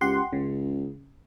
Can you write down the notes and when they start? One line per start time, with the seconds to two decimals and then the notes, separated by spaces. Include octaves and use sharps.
0.01 C#2 G4 F#5 C6
0.33 C#2 C#3